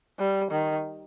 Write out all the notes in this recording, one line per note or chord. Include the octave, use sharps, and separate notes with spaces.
G3
D#3